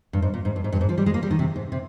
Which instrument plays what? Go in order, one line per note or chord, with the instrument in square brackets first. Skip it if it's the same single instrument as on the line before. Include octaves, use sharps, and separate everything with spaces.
[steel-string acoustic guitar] G2
G#2
A#2
G#2
G2
G#2
G2
G#2
F3
G3
G#3
A#3
G3
D#3
C3
G#2
C3